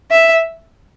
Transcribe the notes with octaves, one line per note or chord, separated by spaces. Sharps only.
E5